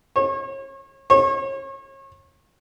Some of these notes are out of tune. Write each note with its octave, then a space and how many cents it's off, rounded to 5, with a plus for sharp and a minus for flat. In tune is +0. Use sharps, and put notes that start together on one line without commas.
C#5 -35
C#5 -35